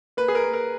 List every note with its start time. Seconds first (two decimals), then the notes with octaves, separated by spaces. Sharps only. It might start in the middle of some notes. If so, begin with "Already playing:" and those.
0.17 A#3 B4
0.28 G#4
0.35 A#4
0.44 A#3
0.54 A#4